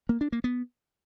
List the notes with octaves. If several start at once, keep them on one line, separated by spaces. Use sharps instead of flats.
A#3
D4
A#3
B3